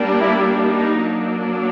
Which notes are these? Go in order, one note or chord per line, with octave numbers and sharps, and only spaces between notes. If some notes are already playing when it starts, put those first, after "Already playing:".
Already playing: G3 A#3 D4
E4
D#4
F#3 A#3 D4